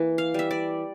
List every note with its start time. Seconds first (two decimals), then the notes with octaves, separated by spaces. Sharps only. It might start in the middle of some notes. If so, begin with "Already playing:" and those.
Already playing: E3 A#3
0.18 F5
0.34 G3 E5
0.51 D5